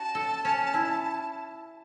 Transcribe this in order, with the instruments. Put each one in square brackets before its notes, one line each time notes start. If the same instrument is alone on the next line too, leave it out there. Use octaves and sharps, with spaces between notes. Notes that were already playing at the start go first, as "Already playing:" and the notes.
Already playing: [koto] C#4 F#4 [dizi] A5
[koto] A4
C#4
E4